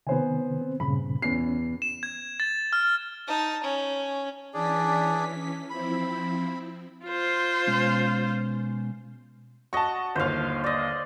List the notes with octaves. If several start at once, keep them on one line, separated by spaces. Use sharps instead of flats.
C3 D#3 B3 C5 G#5
C4
G2 A#2 C#3 B5
E2 C#4 C7
E7
G#6
A6
F6
D#4 A5
C#4
E3 C#4 D4 G#4 D5 B6
F3 C4 E4 B5
F4 C5
B2 G#3 C#4
F#4 D#5 A5 C#6
G1 D#2 C5 F5
D5 D#5